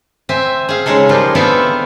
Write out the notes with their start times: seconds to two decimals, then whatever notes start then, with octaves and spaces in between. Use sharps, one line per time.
0.29 C4 E5 G#5
0.69 G#4 F5
0.86 C#3 G#3 D#4 G#4 A4
1.09 F3 G3 A#3 F4
1.35 B3 C4 D4 A4 E5 F5